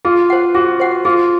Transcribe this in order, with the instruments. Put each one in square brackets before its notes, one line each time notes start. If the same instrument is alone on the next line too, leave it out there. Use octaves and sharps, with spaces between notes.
[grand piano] F4 [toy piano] G#4
[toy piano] C5 F#5
[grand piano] F#4 [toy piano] G#4
[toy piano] C5 F#5
[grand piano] F4 [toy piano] G#4